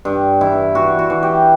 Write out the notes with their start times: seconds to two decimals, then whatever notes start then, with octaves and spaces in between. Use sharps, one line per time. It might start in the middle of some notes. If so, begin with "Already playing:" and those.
0.05 G2
0.40 E3 E4
0.75 E3 F#4
0.99 F#4
1.10 E3
1.23 G4